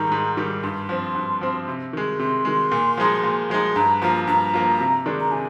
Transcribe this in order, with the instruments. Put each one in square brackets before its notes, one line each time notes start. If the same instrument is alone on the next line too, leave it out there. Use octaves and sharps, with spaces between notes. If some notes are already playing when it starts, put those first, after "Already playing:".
Already playing: [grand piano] G#2 D#3 G3 [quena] A#5
[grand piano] G#2
D#3 G3
[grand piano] G2 [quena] C6
[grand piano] F3 C4
G2
F3 C4
C3
D#3 G#3
[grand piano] C3 [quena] C6
[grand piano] D#3 G#3
A#2
F3 G#3 D#4
A#2
F3 G#3 D#4
[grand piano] G2 [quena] A#5
[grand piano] F3 A#3 F4 [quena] A#5
[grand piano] G2 [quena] A#5
[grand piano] F3 A#3 F4
C3
D#3 G#3 D4
[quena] A#5
[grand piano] C3 [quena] G#5